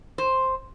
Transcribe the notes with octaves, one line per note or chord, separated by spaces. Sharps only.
C5